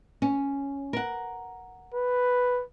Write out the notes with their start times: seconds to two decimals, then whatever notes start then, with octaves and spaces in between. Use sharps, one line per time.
0.22 C#4
0.93 A#4 F#5
1.94 B4